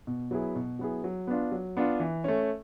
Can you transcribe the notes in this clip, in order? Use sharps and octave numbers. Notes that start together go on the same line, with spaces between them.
B2
F#3 B3 E4 G#4
B2
F#3 B3 E4 G#4
F#3
B3 D4 F4
F#3
B3 D4 F4
E3
A3 C#4